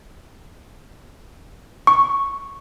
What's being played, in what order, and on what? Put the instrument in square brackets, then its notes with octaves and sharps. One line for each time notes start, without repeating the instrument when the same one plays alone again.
[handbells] C#6